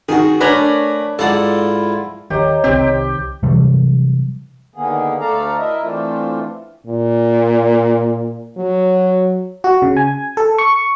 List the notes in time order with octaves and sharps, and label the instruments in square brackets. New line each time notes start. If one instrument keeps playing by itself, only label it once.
[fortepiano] D#3 [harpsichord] F#4 G#4
[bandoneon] A3 [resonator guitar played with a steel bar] D4 A#4 C#5 [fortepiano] B4 [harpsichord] G#5 A#5 B5
[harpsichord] G#2 F5 F#5 [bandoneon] E4 F4 [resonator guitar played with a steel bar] A4 D5
[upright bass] D#2 [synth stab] D#3 [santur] G4 [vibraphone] C#5 D#5 A#5
[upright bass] C2 D#3 [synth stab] C4 [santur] G4
[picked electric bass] C3 E3 F#3 G3
[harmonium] D3 D#3 A#3 B3 G#4
D2 A3 A4 D5 F5 A#5
E4 A#4 D#5 E5
E3 A3 C4 D4 F4
[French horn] A#2
F#3
[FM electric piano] F#4
C#3
G#5
A4
C#6